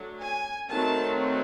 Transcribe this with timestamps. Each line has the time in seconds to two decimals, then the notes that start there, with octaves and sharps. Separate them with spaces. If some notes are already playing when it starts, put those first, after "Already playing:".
Already playing: F#3 A3 D4
0.19 G#5
0.69 D#3 F#3 A3 C4 A5